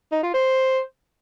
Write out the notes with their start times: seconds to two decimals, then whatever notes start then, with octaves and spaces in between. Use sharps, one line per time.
0.12 D#4
0.23 F4
0.34 C5